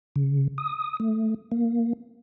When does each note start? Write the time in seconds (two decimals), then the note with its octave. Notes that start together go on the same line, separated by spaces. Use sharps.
0.16 C#3
0.58 D#6
1.00 A3
1.52 A#3